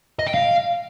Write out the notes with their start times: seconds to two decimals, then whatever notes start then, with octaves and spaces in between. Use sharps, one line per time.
0.19 D#5
0.27 G5
0.34 F5